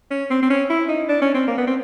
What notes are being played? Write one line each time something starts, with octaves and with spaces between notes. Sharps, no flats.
C#4
C4
C4
C#4
E4
D#4
D4
C#4
C4
A#3
B3
C4